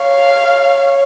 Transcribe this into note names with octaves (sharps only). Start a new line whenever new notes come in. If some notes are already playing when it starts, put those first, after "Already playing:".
Already playing: C#5 F5
C#5